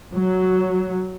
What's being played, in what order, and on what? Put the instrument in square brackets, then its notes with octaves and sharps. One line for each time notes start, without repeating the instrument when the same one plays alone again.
[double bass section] F#3